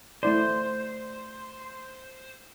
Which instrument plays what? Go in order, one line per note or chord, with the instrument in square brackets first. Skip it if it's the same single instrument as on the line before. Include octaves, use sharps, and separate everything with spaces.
[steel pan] A3 E4 D5 [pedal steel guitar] C5